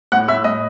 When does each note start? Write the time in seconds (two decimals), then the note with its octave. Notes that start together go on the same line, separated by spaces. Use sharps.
0.12 A2 F#5 F#6
0.28 A2 E5 E6
0.44 A2 D#5 D#6